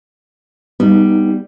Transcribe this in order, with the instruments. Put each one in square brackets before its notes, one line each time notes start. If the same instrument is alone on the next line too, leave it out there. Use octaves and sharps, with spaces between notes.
[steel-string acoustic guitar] G3 [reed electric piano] B3 D#4